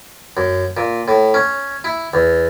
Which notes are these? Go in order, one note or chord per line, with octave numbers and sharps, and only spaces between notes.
F#2
A#2
A2
C#4
E4
E2